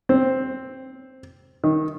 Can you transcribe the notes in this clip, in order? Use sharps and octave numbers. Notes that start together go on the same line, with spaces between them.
C4
D#3